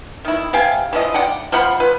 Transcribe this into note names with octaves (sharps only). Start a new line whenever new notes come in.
D#3 E4
C3 F5 G5 G#5
E3 F3 D#5
D5 F#5 G5
F3 F4 F#5 B5
B4